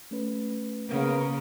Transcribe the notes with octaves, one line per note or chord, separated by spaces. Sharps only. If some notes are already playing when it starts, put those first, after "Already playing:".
A3 C#4 B4
C#3 A#3 B3 A#4